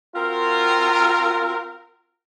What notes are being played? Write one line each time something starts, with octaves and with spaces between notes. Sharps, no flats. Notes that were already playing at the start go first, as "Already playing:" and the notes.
C4 F4 F#4 A#4